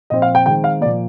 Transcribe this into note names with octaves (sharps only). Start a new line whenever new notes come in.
A#2 F3 C4 D#5
F5
G5
D#3 G#3 C4 G5
F5
A#2 F3 A#3 D5